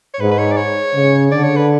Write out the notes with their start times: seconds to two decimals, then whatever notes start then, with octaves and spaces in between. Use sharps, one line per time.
0.14 C#5
0.20 G#2 B4
0.32 B4
0.39 C#5
0.52 D5
0.57 C#5
0.94 C#3
1.32 D3 D5
1.44 C#5
1.56 B4